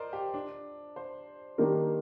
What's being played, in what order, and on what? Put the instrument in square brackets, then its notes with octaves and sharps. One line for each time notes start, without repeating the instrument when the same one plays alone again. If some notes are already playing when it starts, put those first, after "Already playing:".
Already playing: [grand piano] A#4 C5 D5 D#5
G4
D4
C5
[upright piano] D#3 A#3 D4 G4 A#4